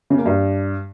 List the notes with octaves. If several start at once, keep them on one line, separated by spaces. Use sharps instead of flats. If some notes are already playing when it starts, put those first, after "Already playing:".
C#3
A#3
G2